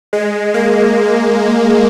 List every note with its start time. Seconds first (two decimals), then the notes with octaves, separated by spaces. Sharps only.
0.13 G#3
0.54 A#3